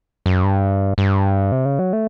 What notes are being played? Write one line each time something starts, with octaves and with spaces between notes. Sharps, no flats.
F#2
G2
G2
C3
C#3
F#3
A3